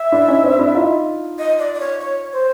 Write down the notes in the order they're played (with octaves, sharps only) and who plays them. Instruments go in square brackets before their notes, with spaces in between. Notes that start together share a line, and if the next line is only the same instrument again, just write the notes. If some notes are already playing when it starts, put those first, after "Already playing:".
Already playing: [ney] E5
[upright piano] D4 E4
C#4 D#4
C4 D4
D4 E4
D#4 F4
[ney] D#5
D5
D5
C#5
C#5
C5